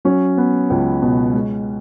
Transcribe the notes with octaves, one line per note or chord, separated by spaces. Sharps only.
F#3 C#4
B3
C#2
B2
G#3